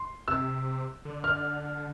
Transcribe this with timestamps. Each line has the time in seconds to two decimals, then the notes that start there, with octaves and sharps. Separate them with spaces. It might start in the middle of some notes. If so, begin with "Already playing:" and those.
Already playing: C6
0.28 C3 E6
1.05 D3
1.24 F6